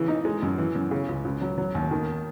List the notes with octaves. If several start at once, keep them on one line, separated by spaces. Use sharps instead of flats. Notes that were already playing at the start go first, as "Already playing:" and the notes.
Already playing: C#3 E3
D#4
G#3
F#2
E3
F#2
C#3
C#2
C#2
F#3
F#3
D#2
D#3